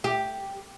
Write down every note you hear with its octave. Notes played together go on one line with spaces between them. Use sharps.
G4